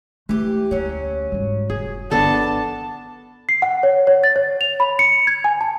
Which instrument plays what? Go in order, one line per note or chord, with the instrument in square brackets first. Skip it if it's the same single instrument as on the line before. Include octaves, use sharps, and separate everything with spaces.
[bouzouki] E3 G4 [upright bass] A3
[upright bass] D2 A#3 [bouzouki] F#3 C#4
[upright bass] G#2 G3
[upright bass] F1 [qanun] G#4
[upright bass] G1 E3 [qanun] B3 D4 A4 [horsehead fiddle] A5
[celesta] C7
F#5
C#5
C#5
A6
C#5
F7
B5
C#7
G#6
G#5
A5